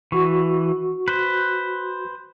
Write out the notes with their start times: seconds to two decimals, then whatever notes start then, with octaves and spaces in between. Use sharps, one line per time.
0.12 E3 F#4 C#6
1.08 B4 C5